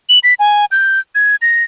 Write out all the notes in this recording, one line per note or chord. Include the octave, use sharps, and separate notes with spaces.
F#7
B6
G#5
G6
G#6
A#6